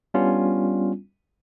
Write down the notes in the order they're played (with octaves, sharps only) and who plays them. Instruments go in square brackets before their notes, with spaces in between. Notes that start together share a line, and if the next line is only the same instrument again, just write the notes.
[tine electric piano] G3 B3 C#4 D4 F4